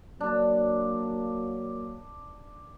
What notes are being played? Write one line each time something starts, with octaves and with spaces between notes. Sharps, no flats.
F#3 A#3 D4